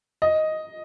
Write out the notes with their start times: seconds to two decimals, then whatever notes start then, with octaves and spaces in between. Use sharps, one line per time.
0.22 D#5